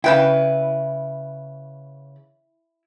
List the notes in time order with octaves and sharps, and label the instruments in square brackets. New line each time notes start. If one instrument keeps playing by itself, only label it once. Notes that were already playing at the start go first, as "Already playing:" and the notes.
[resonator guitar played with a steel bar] C#3 B4 G5 [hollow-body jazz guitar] E4